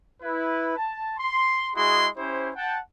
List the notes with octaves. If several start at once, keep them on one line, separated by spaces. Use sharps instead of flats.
E4 B4
A5
C6
G#3 E4 F#4 G#4 D#5 C6
C#4 E4 G4 C5
F#5 G5 A5